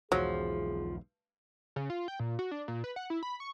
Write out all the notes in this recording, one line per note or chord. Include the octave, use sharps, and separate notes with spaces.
B1 E2 G#2 F3 F#3 G#4
C#3
F4
G5
A#2
F#4
D4
A#2
B4
F#5
E4
B5
C#6